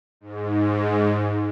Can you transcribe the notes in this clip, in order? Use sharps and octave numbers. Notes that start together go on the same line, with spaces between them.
G#2